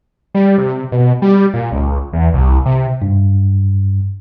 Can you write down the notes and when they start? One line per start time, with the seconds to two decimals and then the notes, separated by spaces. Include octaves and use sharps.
0.35 G3
0.58 C3
0.92 B2
1.22 G3
1.54 A#2
1.72 C#2
2.13 E2
2.34 C2
2.66 C3
3.02 G2